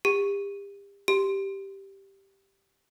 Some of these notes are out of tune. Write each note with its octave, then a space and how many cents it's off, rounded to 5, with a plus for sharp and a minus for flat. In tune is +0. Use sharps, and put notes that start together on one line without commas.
G4 +35
G4 -5